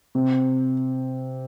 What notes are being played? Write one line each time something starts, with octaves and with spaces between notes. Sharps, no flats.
C3